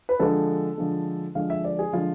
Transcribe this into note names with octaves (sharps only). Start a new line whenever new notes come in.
B4
D3 F3 G#3 A4
D3 F3 G#3
D3 F3 G#3 F5
E5
D5
G#4
D3 F3 G#3 F4